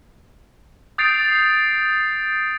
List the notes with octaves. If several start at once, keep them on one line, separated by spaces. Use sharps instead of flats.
D#6 G6 A6 C7 D7 F7